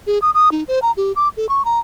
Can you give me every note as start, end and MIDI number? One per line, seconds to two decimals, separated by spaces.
0.07 0.19 68
0.22 0.31 87
0.34 0.52 87
0.52 0.63 63
0.68 0.79 72
0.82 0.91 82
0.97 1.12 67
1.16 1.29 86
1.37 1.49 69
1.49 1.64 85
1.65 1.79 82